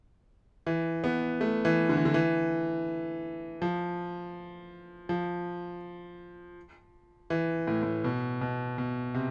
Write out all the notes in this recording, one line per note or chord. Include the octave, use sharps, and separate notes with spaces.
E3
B3
A3
E3
D3
E3
D3
E3
F3
F3
E3
A2
A2
B2
B2
B2
C3